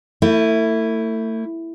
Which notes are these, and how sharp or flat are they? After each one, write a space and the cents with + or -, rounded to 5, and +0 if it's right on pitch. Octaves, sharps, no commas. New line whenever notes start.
A3 +35 E4 +0